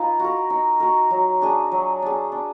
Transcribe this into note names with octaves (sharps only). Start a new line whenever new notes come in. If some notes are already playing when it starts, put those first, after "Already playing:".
Already playing: D#4 F4 B4 F5
F#4 A#4
D#4
F#4 A#4
F#3
D4 G#4
F#3
D4 G#4
D4